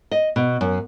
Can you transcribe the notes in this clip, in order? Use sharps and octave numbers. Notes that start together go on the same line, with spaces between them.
D#5
B2
F#2